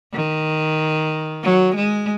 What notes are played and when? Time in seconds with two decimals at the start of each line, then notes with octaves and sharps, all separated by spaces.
0.14 D#3
1.43 F#3
1.75 G#3